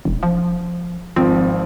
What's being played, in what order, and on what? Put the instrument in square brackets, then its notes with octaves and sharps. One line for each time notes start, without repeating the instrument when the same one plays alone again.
[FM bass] E1
F3
[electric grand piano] G#1 F3 [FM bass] C4